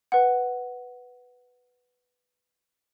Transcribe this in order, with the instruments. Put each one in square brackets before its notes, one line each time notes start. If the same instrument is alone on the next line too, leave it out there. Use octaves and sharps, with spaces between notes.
[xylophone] B4 F#5